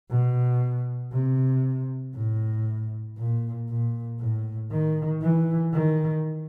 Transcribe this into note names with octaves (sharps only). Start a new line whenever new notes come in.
B2
C3
A2
A#2
A#2
A2
D#3
E3
D#3